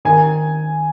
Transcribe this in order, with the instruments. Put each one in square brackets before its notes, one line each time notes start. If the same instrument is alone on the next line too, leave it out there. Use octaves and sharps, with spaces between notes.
[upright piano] D#3 G#5